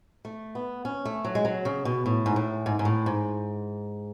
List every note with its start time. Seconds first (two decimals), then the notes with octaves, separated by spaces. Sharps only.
0.25 A3
0.55 B3
0.85 C#4
1.05 A3
1.25 F#3
1.35 G#3
1.45 F#3
1.65 C#3
1.85 B2
2.06 A2
2.26 G#2
2.36 A2
2.66 G#2
2.79 G#2
2.85 A2
3.06 G#2